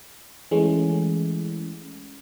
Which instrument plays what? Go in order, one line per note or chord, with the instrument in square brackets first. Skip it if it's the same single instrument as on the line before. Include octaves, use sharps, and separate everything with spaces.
[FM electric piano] E3 G#3 A3 C#4